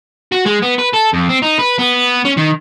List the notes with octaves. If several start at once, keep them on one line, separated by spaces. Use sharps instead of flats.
F#4
G#3
B3
B4
A4
F2
C4
D#4
B4
B3
C#4
D#3